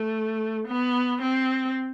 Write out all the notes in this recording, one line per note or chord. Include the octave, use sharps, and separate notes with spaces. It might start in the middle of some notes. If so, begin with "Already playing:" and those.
Already playing: A3
B3
C4